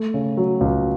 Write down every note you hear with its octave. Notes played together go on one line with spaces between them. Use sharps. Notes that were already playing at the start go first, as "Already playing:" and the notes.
Already playing: A3
C#3
F#3
C#2